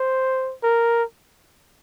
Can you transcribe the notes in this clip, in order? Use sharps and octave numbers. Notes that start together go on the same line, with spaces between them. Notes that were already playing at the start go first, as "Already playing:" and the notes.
Already playing: C5
A#4